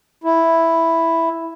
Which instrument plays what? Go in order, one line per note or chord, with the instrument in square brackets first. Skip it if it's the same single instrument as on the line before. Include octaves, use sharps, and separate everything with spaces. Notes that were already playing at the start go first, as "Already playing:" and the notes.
[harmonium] E4